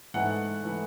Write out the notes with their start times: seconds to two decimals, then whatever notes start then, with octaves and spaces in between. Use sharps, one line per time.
0.14 G#2 E3 A3 F#5
0.63 E3 A3